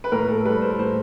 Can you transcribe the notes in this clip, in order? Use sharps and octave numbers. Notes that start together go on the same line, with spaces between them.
B4
A2 A#4
A4
G3 B4
C5
A2 C5